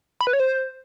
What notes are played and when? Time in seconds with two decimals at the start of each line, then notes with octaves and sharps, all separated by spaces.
0.21 B5
0.27 B4
0.33 C#5
0.40 C5